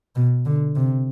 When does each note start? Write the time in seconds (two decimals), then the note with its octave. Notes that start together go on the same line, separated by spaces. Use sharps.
0.16 B2
0.46 D3
0.76 C3